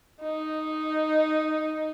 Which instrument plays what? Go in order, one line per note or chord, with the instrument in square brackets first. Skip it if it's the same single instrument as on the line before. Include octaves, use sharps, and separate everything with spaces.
[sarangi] D#4